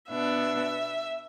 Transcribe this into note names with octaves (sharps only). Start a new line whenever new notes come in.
B2 B3 D4 E5